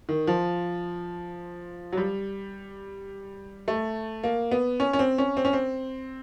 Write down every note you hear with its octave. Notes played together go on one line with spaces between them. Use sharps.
D#3
F3
F#3
G3
A3
A#3
B3
C#4
C#4
C4
C#4
C4
C#4
C4